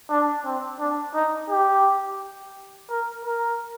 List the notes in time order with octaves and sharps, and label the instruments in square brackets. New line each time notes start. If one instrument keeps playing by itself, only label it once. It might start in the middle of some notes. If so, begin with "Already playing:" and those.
[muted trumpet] D4
C4
D4
D#4
G4
A#4
A#4